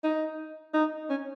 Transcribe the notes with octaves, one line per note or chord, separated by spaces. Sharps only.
D#4
D#4
C#4